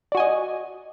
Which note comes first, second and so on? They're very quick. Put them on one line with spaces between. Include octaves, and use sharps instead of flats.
D5 F#4 G#5 D#5